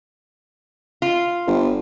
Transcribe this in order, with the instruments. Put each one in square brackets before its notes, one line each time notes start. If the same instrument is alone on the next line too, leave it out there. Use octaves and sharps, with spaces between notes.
[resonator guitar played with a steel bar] F4
[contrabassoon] G1